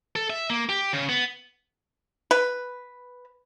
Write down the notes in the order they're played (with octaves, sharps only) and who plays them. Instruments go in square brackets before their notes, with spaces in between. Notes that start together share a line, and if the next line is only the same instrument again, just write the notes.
[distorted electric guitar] A4
E5
A#3
G4
C#3
B3
[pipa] B4